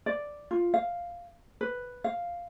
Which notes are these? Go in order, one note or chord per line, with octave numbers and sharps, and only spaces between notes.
D5
F4
F5
B4
F5